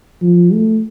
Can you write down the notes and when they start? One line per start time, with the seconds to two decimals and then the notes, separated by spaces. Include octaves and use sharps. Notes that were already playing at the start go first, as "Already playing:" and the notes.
0.22 F3
0.53 A3